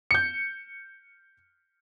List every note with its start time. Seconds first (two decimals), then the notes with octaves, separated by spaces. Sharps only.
0.11 G6 C#7